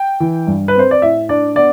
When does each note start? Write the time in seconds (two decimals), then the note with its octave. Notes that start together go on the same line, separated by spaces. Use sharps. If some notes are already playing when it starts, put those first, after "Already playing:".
Already playing: G5
0.20 E3
0.47 G2
0.68 B4
0.75 C4 C5
0.91 D5
1.02 A2 E5
1.29 D4 D5
1.55 B3 D5